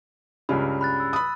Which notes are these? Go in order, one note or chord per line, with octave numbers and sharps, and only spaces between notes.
C#2 G2 C#3 B5
B5 F#6 A6
E6
B5 D#6